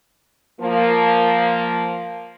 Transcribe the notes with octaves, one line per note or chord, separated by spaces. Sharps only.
F3 A#3